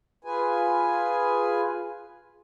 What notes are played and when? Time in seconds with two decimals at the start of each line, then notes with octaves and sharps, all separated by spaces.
0.25 F4 G#4 B4 G#5